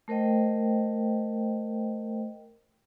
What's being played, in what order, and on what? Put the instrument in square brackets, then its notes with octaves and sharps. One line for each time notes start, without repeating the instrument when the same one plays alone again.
[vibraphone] A3 A#4 C5 D#5 G5